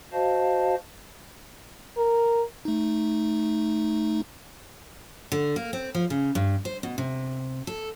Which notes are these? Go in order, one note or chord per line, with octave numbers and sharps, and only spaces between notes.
F#4 C5 D#5 F5 A5
A#4
A3 D#4
D3
A#3
C4
F3
C#3
G2
C5
B2
C3
A4